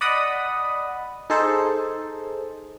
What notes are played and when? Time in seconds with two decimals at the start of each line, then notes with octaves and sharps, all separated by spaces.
0.01 D5 D#5 F#5 B5 D#6
1.30 D#4 G#4 A4 C5